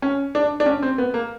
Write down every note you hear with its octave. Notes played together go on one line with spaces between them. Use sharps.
C#4
D4
D4
C#4
C4
B3
A#3